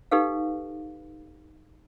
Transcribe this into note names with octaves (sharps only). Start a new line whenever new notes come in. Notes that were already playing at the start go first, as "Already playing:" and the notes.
D#4 G4 A4 B4 F5